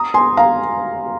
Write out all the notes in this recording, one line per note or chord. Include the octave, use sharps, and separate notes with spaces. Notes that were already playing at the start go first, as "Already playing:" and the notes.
Already playing: A#5 D#6
G#5 C6
F5 A#5